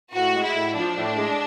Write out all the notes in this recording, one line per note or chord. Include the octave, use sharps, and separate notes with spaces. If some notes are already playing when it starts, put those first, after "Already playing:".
A2 F#4
G#3
E4
A2
F3 D4
A2
G#3